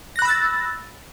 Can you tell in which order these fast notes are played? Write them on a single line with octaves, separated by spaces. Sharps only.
A#6 F#6 B5 E6 A6